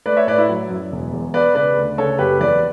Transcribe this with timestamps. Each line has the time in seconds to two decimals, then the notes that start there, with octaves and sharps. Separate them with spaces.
0.06 A3 B4 D5
0.17 C#5 E5
0.27 A2 B4 D5
0.38 E4
0.49 F#3
0.70 F#2
0.92 E1
1.13 E2
1.34 B3 B4 D5
1.55 C#3 B4 D5
1.77 D2
1.98 C#3 A4 C#5
2.19 F#1 G4 B4
2.40 E2 B4 D5